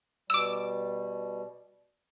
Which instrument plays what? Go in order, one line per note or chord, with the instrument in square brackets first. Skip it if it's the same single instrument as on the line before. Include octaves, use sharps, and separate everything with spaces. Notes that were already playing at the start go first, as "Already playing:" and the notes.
[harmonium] B2 G3 [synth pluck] D6 E6